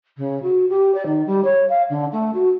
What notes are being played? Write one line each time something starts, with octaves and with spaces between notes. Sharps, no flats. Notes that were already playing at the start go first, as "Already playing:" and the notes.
C#3
F#4
G4
D5
D#3
G3
C#5
F5
D3
A3
F#4